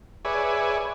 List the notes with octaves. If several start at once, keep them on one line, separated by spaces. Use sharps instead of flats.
G#4 B4 C#5 D5 E5 G#5